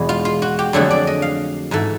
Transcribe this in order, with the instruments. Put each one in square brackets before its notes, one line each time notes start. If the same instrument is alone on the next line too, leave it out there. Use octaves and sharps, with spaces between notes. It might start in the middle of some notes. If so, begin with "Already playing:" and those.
Already playing: [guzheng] E2 B2 G#3
F4
F4
F#4
G4
F2 D3 F#3 A3 G#4
D5
D#5
F5
G#2 E3 A3